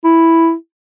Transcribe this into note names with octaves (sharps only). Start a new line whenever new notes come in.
E4